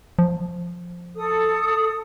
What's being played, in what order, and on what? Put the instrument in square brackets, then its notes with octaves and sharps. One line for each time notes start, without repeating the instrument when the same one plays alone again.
[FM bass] F3
[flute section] A4 D#6